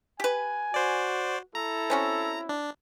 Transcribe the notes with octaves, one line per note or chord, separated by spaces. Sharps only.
G4 B4 G#5
F#4 C5 D5
E4 A4 A#5
C4 C#4 F#4
D4